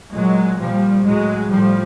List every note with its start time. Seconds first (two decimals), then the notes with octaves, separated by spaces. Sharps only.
0.14 A#2 F#3 G#3
0.59 A#2 F3 G3
1.05 A2 F#3 G#3
1.51 A2 F3 G3